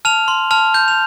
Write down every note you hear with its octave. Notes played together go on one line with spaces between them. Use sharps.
A5 F6 F7
C6
A5 F6 F7
G6
F7